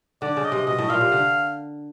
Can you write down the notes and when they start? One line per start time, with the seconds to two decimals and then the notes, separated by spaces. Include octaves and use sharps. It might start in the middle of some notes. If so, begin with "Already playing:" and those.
0.22 D3 D5
0.37 C#3
0.44 D#5
0.52 C3
0.67 B2 D#5
0.78 A2
0.90 A#2 F5
1.01 C3
1.12 D3